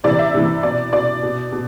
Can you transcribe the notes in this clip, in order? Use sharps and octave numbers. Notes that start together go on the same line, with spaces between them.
C3 E3 D5
E5
C3 E3
B2 D5
B2 D5
B2
B2